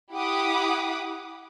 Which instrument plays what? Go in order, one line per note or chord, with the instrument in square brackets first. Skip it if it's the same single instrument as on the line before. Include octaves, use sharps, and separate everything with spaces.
[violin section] E4 G4 F#5 B5 D6 D#6